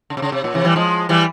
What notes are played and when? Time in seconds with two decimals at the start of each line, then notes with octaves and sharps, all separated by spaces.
0.10 C#3
0.17 C3
0.22 C#3
0.32 C3
0.44 A#2
0.54 C3 E3
0.65 E3 G3
0.76 F3 G#3
1.09 E3 G3